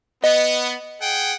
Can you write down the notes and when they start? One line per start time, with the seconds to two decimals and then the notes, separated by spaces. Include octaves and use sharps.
0.24 B3 D#5
1.02 G#4 F#5 G5